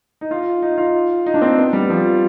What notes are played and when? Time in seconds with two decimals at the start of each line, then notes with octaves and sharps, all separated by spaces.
0.21 D#4
0.31 F4
0.62 D#4
0.78 F4
1.26 D#4
1.34 D4
1.42 C4
1.58 B3
1.73 G3
1.90 F3